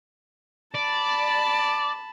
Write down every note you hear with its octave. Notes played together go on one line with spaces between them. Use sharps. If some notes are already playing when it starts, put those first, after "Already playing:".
D5 A5 B5